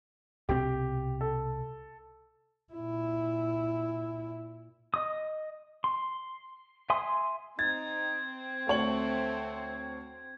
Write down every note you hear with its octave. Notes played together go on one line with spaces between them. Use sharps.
C2 B2 C4 G4
A4
A#2 E4
D#5 D#6
C6
E5 G#5 C6 D#6
C4 D#4 G#6 A6
D2 A3 C#5 F#7